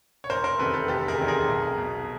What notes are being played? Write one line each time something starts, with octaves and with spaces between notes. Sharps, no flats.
C#5
F1 A#4 C5
A#4 C5
E2 C3 D#3 A4 B4
A4 B4
F1 G4 A4
G#4 A#4
E2 C3 D#3
G#4 A#4
B1
B2